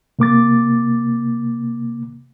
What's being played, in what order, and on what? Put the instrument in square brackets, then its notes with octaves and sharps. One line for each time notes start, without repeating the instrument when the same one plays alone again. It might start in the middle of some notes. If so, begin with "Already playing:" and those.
[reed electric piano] C3 A#3 D6 A6